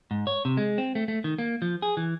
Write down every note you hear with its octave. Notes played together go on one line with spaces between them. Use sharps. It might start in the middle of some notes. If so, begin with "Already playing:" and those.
G#2
C#5
C3
G#3
C4
A3
A3
D#3
A#3
F3
G#4
E3